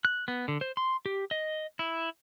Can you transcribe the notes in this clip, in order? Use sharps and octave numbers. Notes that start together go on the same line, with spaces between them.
F#6
B3
D3
C5
C6
G4
D#5
E4